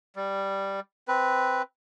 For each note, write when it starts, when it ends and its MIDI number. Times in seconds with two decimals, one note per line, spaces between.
0.16 0.80 55
1.08 1.62 60
1.08 1.62 71